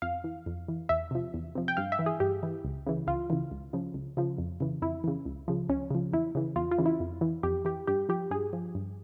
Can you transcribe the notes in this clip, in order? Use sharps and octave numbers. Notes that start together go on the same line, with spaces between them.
F2 F5
E3
F2
E3
E2 E5
C3 F3
E2
C3 F3
G5
G2 F5
E5
E3
G#4
G2 G4
E3
C#2
C#3 E3
C#2 F4
C#3 E3
C#2
C#3 F3
C#2
C#3 F3
F2
C#3 E3
F2 E4
C#3 E3
C#2
C#3 F3
C#2 C#4
C#3 F3
E2 E4
C#3 E3
E2 F4
F4
C#3 E3
E4
F2
E3
F2 G4
E3 G4
G2 G4
F3 G4
G2 G#4
F3
G2